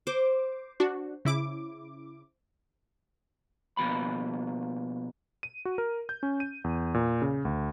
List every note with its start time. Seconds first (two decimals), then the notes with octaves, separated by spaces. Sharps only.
0.07 C5 D6
0.80 D4 F#4
1.25 C#3 E4 D6
3.77 B2 F3 A#3 B5
5.43 D#7
5.65 F#4
5.78 A#4
6.09 G6
6.23 C#4
6.40 D#7
6.64 E2
6.94 A#2
7.22 C#3
7.45 D2